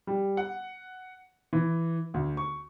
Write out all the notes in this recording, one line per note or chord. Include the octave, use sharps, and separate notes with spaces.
G3
F#5
E3
D2
C#6